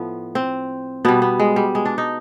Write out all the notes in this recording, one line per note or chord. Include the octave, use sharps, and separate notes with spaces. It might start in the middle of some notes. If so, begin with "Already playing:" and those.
Already playing: A2 F3 B3
C4
B2 G3 B3
B3
G#3
G3
G#3
D4
D#4